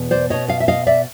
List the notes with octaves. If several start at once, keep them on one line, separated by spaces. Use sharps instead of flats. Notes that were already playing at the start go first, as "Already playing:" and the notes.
Already playing: E2 B2
C5 D5
E2 B2 C#5 D#5
D#5 F5
E5
D#5 F5
D5 E5